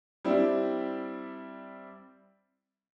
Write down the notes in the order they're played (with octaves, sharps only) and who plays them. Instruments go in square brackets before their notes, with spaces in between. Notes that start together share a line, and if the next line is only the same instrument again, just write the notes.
[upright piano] G3 C4 D4 E4